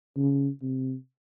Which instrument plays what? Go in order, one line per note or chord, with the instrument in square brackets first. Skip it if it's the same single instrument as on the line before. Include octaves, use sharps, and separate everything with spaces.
[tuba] C#3
C3